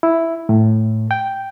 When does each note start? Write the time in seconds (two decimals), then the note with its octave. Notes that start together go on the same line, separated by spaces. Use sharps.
0.03 E4
0.49 A2
1.11 G5